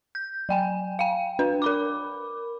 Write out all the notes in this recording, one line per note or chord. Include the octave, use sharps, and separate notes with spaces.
G6
F#3 G5 G#5
F5 G5
D4 B4
A#4 B5 D6